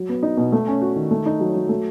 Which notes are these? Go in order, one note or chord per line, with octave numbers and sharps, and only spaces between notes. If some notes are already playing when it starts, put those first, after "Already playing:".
Already playing: F#3
B3
D#4
B2
A3
C#4
F#4
D#3
A3
D#4
F#3
F#3
A3